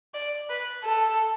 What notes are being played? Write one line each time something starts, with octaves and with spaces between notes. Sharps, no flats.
D5
B4
A4